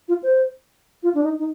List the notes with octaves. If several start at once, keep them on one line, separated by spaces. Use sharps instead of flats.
F4
C5
F4
D4
D#4
D#4